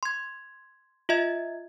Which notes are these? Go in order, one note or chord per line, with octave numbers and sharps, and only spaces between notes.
C6 G#6
F4 D#5 E5 G#6